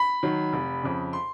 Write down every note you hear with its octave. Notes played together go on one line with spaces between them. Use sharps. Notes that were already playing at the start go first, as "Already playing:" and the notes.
Already playing: B5
D#3 F#3
F1
F2 C#3
C6